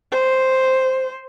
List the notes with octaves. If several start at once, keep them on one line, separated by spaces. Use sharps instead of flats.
C5